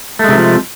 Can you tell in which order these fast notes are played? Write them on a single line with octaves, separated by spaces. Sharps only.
A3 G#3 C3 E3 F3